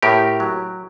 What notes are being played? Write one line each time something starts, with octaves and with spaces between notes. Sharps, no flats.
A2 G4 A#4
F#3